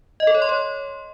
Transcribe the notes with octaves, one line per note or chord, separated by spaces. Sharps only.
D#5
A4
C#5
C6
C#5